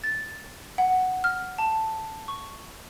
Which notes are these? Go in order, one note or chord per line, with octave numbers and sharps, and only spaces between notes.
A6
F#5
F6
A5
C#6